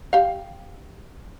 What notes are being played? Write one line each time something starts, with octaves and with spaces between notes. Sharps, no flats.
G4 F5